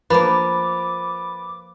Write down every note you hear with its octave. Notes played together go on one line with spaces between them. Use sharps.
F3 A#3 B4 B5 D6 A6